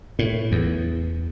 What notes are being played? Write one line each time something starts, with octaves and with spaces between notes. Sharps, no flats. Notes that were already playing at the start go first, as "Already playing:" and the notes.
A2
E2